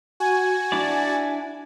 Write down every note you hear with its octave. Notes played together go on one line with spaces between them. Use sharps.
F#4 G#5
D4 E4 D5